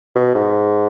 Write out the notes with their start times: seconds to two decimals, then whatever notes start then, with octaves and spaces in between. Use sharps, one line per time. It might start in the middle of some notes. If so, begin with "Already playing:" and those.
0.15 B2
0.35 G#2